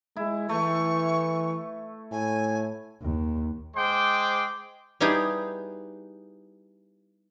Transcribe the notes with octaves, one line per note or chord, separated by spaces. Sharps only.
G#3 E4
E3 A3 C#6
A2 G#5
D#2
G#3 C5 G5 C6 D6
G3 B3 D#4 E4 G4 G#4